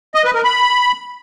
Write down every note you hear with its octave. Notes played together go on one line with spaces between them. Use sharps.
D#5
B4
A#4
B5